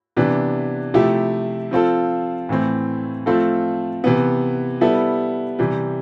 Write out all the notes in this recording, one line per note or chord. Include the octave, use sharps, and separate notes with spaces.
C3 E3 B3 D4
C3 F3 A3 E4 G4
F3 C4 F4 A4
A2 E3 A3 C4
F3 A3 C4 F4 A4
C3 E3 B3
G3 B3 E4 A4
C3 E3 G3